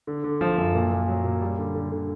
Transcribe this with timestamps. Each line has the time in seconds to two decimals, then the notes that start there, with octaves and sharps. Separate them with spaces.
0.07 D3
0.24 D3
0.41 F3
0.58 F#2
0.75 A#2
0.91 A#2
1.08 F#3
1.24 A#2
1.41 G3
1.58 D3
1.75 D3
1.92 D3